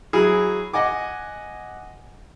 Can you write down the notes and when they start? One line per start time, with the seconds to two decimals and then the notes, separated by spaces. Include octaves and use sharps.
0.13 F#3 E4 G#4
0.73 D#5 F#5 G#5 D6